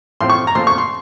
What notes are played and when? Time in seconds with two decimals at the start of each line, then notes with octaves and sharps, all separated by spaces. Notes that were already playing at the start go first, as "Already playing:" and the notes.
0.21 A2 F3 C4 C6
0.30 C#6
0.47 A#5
0.55 A#2 F3 A3 C6
0.67 C#6
0.78 C6